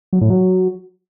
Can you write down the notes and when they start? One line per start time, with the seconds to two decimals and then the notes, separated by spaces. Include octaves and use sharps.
0.13 F#3
0.21 A2
0.30 F#3